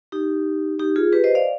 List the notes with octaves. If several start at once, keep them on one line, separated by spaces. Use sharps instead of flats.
D#4 G4
D#4 G4
F4 G#4
G4 B4
C5 D#5
D5 F5